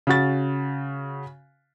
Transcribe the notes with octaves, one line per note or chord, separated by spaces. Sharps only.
C#3 F#4 A6